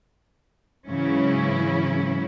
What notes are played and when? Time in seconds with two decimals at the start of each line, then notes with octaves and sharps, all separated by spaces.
0.88 G#2 C#3 E3 F#3 C#4 E4